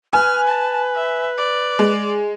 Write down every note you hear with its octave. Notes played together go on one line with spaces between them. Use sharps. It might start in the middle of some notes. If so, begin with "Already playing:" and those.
B4 G#5 F6
A5
E5
D5
G#3